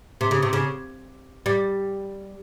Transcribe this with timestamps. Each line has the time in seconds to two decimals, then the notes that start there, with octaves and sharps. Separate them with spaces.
0.21 C3
0.31 C#3
0.42 C3
0.53 C#3
1.46 G3